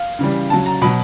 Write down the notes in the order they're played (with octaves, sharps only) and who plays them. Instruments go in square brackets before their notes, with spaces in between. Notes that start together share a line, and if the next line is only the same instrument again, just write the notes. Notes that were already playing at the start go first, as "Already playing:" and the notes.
Already playing: [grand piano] F5
C#3 E3 G3
C#3 F#3 A5
A#5
B2 F#3 B5